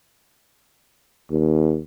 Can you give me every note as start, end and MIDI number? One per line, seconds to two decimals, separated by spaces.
1.31 1.82 39